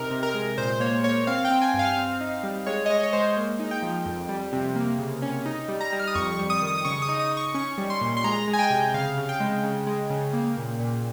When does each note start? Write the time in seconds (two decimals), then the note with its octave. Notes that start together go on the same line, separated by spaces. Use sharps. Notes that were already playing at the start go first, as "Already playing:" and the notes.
Already playing: C3 D#4 A#4
0.11 C3
0.23 A#4
0.34 G#3
0.58 A#2 C5
0.80 A#3 C#5
1.04 A#3 C#5
1.27 C4 F5
1.45 G5
1.50 C4
1.62 G#5
1.74 G2
1.79 F5
1.97 C4
2.21 D#4
2.43 G3
2.66 G#3 C#5
2.86 D#5
2.90 G#3 C#5
3.03 C#5
3.13 G#3 C5
3.37 A#3
3.60 D#4
3.71 G5
3.83 F3
4.06 F2
4.29 G3
4.53 C3
4.76 A#3
4.99 C#3
5.22 C#4
5.46 D#4
5.68 G3
5.81 A#5
5.92 G3
5.99 F6
6.07 D#6
6.15 F2 C#6
6.33 C#6
6.39 G3
6.50 D#6
6.61 D#3
6.67 D#6
6.78 D#6
6.85 C#3 C#6
7.02 D#6
7.09 D#4
7.20 D#6
7.31 D#4
7.37 C#6
7.54 C#4 C#6
7.78 G3
7.90 C6
8.01 A#2
8.17 C6
8.24 G#3 A#5
8.48 G#3
8.53 G#5
8.59 G5
8.70 C3
8.94 C#3 F5
9.17 C#3
9.29 G5
9.40 G#3
9.63 C#3
9.87 G#3
10.10 C#3
10.33 A#3
10.57 A#2
10.80 A#2